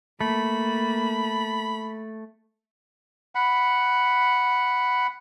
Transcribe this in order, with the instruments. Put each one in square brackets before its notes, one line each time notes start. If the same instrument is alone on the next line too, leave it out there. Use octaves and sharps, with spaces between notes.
[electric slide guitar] A3 [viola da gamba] A#3 [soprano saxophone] B5
[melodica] F#5 B5